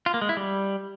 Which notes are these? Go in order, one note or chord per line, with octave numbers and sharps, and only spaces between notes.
F4
A#3
G#3
E4
G3